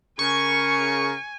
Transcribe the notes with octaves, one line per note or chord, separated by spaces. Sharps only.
C#3 A#4 G#5 C#6